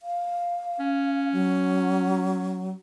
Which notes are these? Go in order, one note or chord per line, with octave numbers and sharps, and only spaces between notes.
F5
C#4
F#3